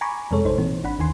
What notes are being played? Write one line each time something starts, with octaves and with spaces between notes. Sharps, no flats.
G#5 A#5 B5 C#6 D6
F2 C3 G#3 A4 C#5
A1 D#4 C5
A#2 E3 C4
G#1 D4 F#5 B5
D#2 D#3 G#5 C6